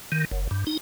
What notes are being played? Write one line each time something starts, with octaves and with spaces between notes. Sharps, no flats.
D#3
F#1
G2
D#4